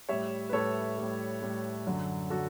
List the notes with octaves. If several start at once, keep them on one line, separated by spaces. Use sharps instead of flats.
A2 G3 C#5 E5
B4
A2 G3 A4 C#5
A2 G3
A2 G3
F#2 D3 F#3
D3 F#3 F#4 A4